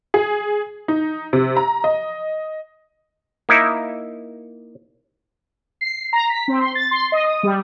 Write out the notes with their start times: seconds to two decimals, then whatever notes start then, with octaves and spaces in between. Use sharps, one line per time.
0.14 G#4
0.88 D#4
1.33 C3
1.57 A#5
1.84 D#5
3.49 A#3 D#4 E4 E5
5.81 C7
6.13 A#5
6.30 B6
6.48 C4
6.60 C6
6.75 A6
6.91 C6
7.12 D#5
7.24 D#6
7.43 G3